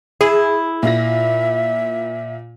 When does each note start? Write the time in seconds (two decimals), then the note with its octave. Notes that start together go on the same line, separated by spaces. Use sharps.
0.21 E4 G#4
0.83 A#2 F4 E5 A#6